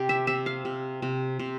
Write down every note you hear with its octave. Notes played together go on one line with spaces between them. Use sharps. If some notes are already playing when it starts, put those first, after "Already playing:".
Already playing: C3 G4
E5
C3 E5
F5
C3
C3
C3